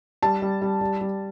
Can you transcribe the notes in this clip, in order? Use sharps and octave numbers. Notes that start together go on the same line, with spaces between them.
G3 A5
G3
G3
G3
G3